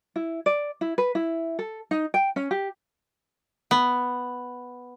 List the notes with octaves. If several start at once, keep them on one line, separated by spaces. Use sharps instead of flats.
E4
D5
E4
B4
E4
A4
D#4
G5
C#4
G4
B3